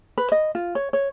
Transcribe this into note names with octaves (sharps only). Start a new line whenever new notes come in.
B4
D#5
F4
C#5
C#5